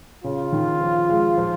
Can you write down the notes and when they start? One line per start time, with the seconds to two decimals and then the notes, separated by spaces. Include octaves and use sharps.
0.24 C#3 F4
0.52 D#3
0.81 F3
1.09 G#3
1.38 F3